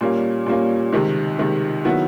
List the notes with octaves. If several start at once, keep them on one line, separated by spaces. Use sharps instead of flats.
A#2 G3 A#3 C#4
A#2 G3 A#3 C#4
C#2 C3 D#3
C#2 C3 D#3
D#3 F#3 B3 E4